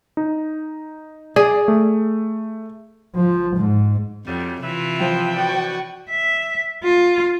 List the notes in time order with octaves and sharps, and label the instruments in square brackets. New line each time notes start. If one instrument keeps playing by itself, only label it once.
[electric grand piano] D#4
[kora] G#4 [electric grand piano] D5
[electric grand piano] A3
[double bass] F3
G#2
[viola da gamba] F2 [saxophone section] C#3 F#3 G3
[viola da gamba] C3 E3 F4 [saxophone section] B4 E5
[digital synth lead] F3 [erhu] G5
[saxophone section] A2 B4 D5 [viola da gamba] F#4
[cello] E5
F4